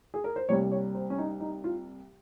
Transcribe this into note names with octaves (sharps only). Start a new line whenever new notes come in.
G#4
A#4
C5
C2 C3 G3 A#3 C#5
C#5
C5
C#4
D#4
D#4
F4